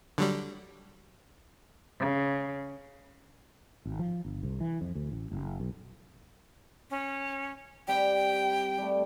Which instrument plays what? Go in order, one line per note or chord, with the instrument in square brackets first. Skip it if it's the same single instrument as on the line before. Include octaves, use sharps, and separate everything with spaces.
[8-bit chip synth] D3 F#3 G3
[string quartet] C#3
[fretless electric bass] G#1
F3
G1
C2
E3
F2
D2
A1
F#1
B1
[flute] C#4
[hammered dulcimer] G3 C4 [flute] G5
[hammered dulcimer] G3 A3